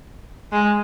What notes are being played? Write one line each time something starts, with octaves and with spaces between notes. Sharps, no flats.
G#3